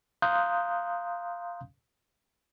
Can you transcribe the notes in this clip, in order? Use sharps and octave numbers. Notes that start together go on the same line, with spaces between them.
F5 A#5 C6 D#6 F#6 G6